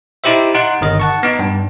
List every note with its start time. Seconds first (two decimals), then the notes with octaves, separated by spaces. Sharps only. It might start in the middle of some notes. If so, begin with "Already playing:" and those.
0.24 D#4 E4 G4 C5 E5
0.55 D#4 F#5 C6 F#6
0.81 G1 D#3 D#5
1.00 F#5 A5 C#6
1.23 B3 D#4
1.39 G2